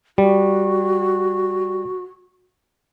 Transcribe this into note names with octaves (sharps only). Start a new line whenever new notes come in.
G3 F#4